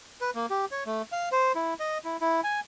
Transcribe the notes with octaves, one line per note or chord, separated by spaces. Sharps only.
B4
A#3
G4
C#5
A3
F5
C5
E4
D#5
E4
E4
G#5